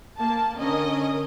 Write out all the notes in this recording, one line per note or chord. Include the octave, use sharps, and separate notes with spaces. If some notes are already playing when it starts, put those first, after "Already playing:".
A#3 A5
D3 C#4 A#4 D#5 D#6